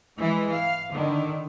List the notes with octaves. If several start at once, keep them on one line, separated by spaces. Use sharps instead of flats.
E3 G#3
F5
D3 D#3